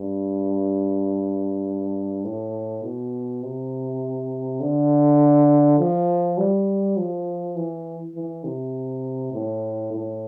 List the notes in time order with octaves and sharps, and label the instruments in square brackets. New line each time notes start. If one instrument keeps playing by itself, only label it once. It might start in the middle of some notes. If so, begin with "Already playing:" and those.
Already playing: [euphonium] G2
A2
B2
C3
D3
F3
G3
F3
E3
E3
C3
A2
A2